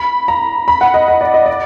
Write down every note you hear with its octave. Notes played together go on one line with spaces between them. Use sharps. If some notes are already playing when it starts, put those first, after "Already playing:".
Already playing: B5
A#5
B5
F#5
D#5
D#5
D5
D#5
D5